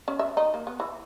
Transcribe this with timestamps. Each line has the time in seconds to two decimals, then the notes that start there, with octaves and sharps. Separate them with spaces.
0.08 C#4
0.19 E5
0.37 D#4
0.54 A#3
0.67 B3
0.80 E3